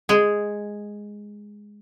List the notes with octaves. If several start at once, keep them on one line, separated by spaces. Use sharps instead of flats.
G#3 G#4